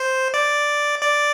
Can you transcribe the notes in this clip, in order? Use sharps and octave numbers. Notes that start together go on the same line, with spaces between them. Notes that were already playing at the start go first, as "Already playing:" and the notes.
Already playing: C5
D5
D5